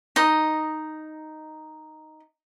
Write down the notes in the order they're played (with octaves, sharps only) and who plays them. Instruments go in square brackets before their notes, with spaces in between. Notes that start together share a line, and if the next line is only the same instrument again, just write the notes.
[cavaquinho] D#4 D#5